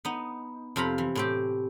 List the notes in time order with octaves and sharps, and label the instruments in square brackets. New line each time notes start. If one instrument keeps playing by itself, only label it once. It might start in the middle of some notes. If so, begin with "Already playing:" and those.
[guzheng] B3 D#4
F2 C3 F4 A#5 B5
E3
A2 C4 G4